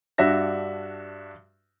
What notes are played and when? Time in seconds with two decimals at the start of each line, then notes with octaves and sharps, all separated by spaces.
0.18 G2 D4 F#4 E5 A#6